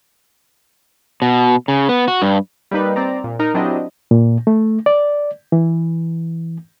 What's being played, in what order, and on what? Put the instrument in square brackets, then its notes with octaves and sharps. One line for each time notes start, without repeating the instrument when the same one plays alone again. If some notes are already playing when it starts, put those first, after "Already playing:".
[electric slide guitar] B2
C#3
B3
F#4
G2
[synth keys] G3 A#3 D#4 B4
C4 D5 A#5
A#2
D#4 A#4
F#3 C4 D4 E4 G4 D#5
[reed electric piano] A#2
A3
D5
E3